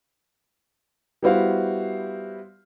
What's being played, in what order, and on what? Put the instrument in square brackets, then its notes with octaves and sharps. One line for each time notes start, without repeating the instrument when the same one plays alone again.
[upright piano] G3 B3 E4 F#4 C5 F5